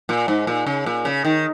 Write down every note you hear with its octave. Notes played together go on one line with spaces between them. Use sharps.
A#2
G#2
A#2
C#3
A#2
C#3
D#3